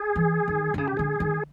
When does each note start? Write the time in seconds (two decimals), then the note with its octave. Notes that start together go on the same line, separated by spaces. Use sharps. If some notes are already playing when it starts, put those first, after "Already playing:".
Already playing: G#4
0.16 E3
0.48 D#3
0.74 D3
0.78 C#3 G#4
0.88 G4
0.97 D3 G#4
1.20 D#3